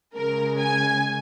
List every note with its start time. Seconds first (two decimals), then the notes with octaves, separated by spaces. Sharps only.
0.16 C#3 G#3 A#4
0.59 G#5